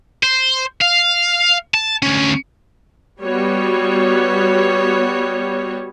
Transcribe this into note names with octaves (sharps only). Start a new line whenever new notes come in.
C5
F5
A5
D2 C#4
G3 B3 F#4 C#5